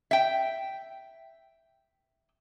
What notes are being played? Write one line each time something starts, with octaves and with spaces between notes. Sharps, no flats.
E5 G5